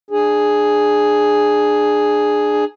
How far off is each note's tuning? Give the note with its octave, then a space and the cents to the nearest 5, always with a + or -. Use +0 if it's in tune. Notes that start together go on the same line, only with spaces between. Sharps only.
D4 +25 G#4 +0